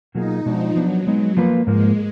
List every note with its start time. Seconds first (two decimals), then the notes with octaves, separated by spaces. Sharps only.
0.15 B2 F#3 A#3 D#4 F4 G#4
0.45 B2 F3 G#3 D4 F#4
0.76 F3 F#3 B3 D4
1.07 G#3 B3 D#4
1.37 F3 A#3 F4 B4
1.67 G#2 F3 G#3 A#3